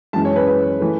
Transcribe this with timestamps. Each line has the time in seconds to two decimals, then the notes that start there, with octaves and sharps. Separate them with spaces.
0.13 F#2 E3 G#3 A5
0.25 C#5
0.36 B4
0.47 B4
0.80 E3 A3